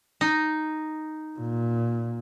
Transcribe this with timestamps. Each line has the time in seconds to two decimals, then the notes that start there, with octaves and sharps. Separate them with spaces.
0.21 D#4
1.39 A#2